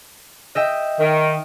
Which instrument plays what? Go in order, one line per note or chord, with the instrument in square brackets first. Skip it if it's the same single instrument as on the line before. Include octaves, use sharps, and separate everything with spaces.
[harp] D#5 E5 G5
[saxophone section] D#3